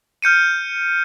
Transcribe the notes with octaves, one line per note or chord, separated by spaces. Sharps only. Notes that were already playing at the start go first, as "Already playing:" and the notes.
F6 G6 C#7 D#7